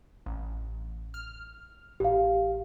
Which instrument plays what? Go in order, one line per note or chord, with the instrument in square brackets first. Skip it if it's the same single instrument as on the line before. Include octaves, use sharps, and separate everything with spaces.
[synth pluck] A1
F6
[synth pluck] A1 [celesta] G4 F5